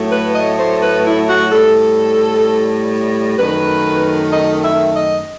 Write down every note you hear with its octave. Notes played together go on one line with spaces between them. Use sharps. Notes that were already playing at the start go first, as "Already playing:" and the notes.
Already playing: A2 F#3 A3
B4
D#5
C5
B4
E4
F#4
A2 G3 A4
F#2 D#3 A3 B4
D#5
E5
D#5